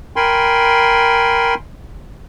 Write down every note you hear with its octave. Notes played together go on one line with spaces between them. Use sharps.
A#4 G5 G#5 B5 C6